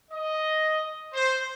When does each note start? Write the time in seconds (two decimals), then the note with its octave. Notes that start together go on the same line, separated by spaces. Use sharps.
0.11 D#5
1.14 C5